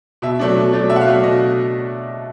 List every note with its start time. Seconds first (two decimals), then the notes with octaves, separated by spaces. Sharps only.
0.22 B2 E5
0.39 F#3 A3 D4
0.56 B2
0.73 F#3 A3 D4
0.89 B2 E5
0.96 F#5
1.01 F5
1.07 F#3 A3 D4
1.23 B2 D#5